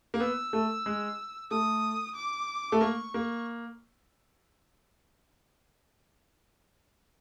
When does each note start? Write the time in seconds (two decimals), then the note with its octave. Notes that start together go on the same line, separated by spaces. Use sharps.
0.14 A#3
0.20 B3 E6
0.53 A3
0.86 G#3
1.51 A3 D#6
2.15 D6
2.72 A3
2.81 A#3 C#6
3.14 A#3